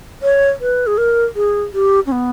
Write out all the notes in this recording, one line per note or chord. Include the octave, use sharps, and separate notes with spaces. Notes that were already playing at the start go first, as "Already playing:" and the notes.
C#5
B4
G#4
A#4
G#4
G4
C#4
B3